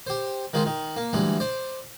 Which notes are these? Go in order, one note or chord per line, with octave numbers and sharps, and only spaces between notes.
G4 C5
D#3 G#3 F4 C5
D#3
A#3
D2 E3 G3 G#3
C5 D5